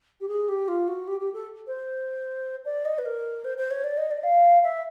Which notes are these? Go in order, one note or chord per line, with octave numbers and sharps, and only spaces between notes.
G4
G#4
G4
F4
F#4
G4
G4
A4
C5
D5
D#5
B4
A#4
C5
C5
C#5
D5
D#5
D5
F5
E5